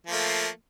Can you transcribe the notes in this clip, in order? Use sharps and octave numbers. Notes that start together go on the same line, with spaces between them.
F3 A3 A#3